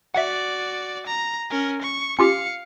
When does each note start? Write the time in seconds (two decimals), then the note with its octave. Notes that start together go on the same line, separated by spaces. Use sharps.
0.15 F#4 D5 E5 F#5
1.07 A#5
1.50 C#4 A#4
1.82 C#6
2.19 C#4 F4 G4 F5 C#7